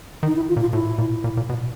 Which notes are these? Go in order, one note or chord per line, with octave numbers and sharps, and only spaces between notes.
D#3
D#4
E4
F4
A#2
F4
A2 E4
A#2
A#2
A#2
B2